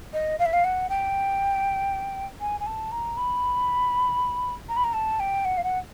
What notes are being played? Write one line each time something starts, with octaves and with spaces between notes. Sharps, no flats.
D#5
F5
E5
F5
F#5
G5
G#5
G#5
A5
A#5
B5
A#5
B5
A#5
A5
G5
F#5
F5
F#5